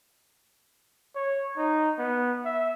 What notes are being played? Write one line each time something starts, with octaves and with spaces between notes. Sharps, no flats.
C#5
D#4
B3
E5